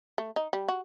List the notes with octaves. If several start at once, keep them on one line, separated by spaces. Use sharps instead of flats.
A3
D#4
G3
F#4